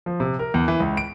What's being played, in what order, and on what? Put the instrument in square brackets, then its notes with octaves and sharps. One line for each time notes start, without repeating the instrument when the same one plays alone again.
[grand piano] F3
C3
A#4
E2
E3
C#2
D7